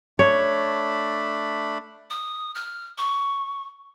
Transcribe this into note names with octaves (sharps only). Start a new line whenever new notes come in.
A3 D4 C#5 B5
D#6
F6
C#6